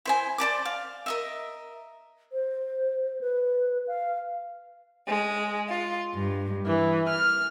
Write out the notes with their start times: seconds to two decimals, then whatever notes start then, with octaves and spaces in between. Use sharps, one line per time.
0.05 E4 C5 G#5
0.38 C5 D5 A5 D6
0.65 F5
1.06 A#4 D#5 E5
2.32 C5
3.21 B4
3.87 F5
5.07 G#3
5.69 F4
6.14 G2
6.65 E3
7.08 F6